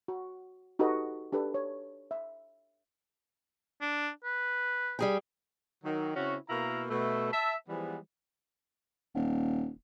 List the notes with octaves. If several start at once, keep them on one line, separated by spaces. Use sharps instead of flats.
F#4
D#4 F#4 G4 A4 B4 D#5
D4 G4 A4 B4
C#5
E5
D4
B4
G3 G#4 G5
D#3 F#3
C#3 C4 C#4 E4 F#4
B2 A#3 E4 A#4 F5 A#5
B2 A3 E5
E5 A5
E3 F3 G3 G#3 B3
D#1